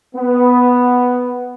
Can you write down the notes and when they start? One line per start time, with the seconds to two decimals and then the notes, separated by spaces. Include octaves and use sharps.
0.15 B3